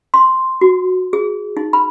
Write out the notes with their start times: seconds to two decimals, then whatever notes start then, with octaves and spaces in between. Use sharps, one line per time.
0.14 C6
0.61 F#4
1.13 G#4
1.57 D#4
1.73 B5